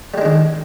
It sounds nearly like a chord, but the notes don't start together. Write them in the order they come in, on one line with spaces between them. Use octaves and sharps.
G3 G#3 D4 D#3